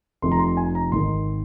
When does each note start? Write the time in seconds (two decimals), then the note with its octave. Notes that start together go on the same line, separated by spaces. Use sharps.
0.22 F1 F2 C3 F3 C6
0.32 A#5
0.39 C6
0.57 G#5
0.75 A#5
0.92 G#1 G#2 D#3 C6